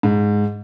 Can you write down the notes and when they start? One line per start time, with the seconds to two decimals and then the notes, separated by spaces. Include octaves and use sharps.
0.03 G#2